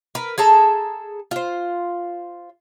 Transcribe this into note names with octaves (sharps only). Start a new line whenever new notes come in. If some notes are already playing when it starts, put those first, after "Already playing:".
A#4 B4
G#4 A4 A5 A#5
F4 C5